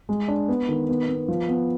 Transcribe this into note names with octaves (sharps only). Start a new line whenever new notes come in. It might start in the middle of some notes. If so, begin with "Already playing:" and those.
G#3
D4
B3
D#3
B3
B3
F3
B3